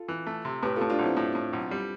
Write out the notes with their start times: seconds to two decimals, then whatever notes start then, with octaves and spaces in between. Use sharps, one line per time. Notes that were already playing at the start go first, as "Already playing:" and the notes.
Already playing: F4 A4
0.08 E3
0.27 A3
0.45 C3
0.63 A2 G4 B4
0.76 F4 A4
0.81 A2
0.90 D4 F4
0.99 B1 C4 E4
1.17 A2
1.35 A2
1.53 B1
1.71 G3